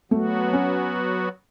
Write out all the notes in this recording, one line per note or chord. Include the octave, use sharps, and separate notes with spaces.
F#3 A3 B3 F#4
C#4